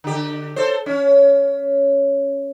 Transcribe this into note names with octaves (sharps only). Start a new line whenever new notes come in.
D3 G4
A4 C5
C#4